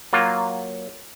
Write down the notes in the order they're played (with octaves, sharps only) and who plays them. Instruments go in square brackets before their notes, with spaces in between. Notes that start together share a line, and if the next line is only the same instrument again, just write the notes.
[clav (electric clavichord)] F#3 A#3 F4